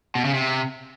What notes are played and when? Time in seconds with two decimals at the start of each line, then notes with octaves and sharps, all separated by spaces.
0.15 B2
0.25 C#3
0.34 C3